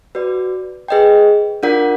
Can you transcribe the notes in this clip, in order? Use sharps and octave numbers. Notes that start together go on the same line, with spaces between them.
F#4 B4 D5
G#4 B4 D#5 G5
D4 F4 A#4 D5 F#5